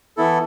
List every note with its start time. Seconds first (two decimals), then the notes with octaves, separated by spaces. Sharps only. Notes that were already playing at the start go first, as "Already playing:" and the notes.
0.17 E3 B3 E4 A4